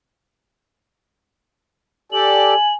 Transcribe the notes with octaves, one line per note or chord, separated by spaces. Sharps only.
G4 A4 D5 G#5 F#7